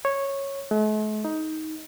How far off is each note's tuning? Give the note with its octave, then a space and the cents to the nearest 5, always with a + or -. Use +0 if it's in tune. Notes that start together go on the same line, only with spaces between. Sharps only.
C#5 -10
A3 -45
D#4 +15